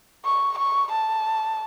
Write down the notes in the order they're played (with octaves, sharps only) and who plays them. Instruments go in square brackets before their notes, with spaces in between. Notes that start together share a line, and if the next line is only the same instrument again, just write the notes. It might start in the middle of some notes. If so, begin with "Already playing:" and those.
[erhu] C#6
C#6
A5